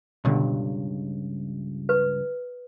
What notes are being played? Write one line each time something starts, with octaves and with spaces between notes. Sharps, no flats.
C#2 G2 B2 D3
B4